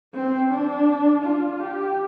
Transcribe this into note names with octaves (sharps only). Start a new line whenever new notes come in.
C4
D4
F4
G4